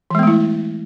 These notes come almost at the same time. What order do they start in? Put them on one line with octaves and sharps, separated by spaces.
E3 G#3 B3 A3 E4